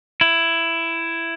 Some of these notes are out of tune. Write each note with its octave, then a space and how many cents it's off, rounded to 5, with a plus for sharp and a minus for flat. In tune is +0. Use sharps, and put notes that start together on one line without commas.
E4 +10